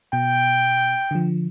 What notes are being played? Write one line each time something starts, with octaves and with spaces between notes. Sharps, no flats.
B2 G5
D3 F3